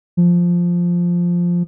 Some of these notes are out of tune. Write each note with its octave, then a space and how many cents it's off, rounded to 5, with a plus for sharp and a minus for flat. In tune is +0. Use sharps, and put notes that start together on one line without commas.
F3 +0